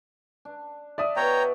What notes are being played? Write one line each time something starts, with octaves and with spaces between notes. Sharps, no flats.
D4
D5 E5 D#6
B2 F#4 C#5 F#5 G5 A#5